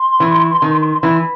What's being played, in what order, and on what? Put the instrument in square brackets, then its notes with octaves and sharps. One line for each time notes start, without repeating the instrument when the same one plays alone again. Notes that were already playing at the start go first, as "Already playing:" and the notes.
Already playing: [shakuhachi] C6
[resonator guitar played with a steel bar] E3
D#3
E3